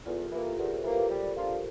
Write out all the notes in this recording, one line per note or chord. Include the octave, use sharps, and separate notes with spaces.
E2 F4 A4
G4 A#4
E3 A#3
F4 A4
E2 G4 A#4
A4 C5
E3 A#3
G4 A#4
G3
A#3 D4 F4